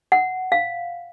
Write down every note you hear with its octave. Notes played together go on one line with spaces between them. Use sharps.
F#5
F5